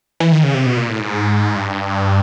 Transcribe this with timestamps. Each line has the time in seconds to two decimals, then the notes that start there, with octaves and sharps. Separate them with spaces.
0.20 E3
0.32 D#3
0.44 C#3
0.54 C3
0.66 B2
0.77 A#2
0.89 A2
1.00 G#2
1.56 G2